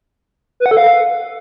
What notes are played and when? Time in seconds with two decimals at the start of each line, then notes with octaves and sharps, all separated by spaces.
0.60 B4
0.66 F#5
0.71 A4
0.77 F5